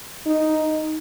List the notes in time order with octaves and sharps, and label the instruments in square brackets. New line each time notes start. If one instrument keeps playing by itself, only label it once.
[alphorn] D#4